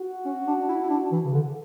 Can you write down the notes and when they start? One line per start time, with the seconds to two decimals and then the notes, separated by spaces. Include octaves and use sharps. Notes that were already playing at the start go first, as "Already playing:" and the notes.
Already playing: F#4
0.25 C#4
0.47 D4
0.68 E4
0.83 E4
0.90 D4
1.12 E3
1.25 C#3
1.33 D3